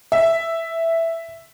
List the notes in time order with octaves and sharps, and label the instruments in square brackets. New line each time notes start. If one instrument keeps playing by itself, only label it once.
[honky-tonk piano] E5